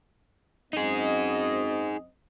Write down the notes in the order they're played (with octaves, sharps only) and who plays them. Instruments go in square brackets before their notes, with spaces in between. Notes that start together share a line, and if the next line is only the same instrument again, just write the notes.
[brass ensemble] F#2 C4 D#5 [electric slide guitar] D#4 G#4